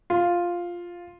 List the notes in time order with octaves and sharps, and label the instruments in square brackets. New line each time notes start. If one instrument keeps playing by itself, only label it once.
[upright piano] F4